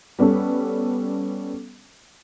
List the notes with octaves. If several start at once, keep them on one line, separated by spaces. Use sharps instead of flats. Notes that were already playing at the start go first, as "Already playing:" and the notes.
G3 B3 C#4 A4